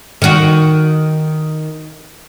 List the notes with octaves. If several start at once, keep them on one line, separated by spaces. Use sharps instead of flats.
D#3 F#4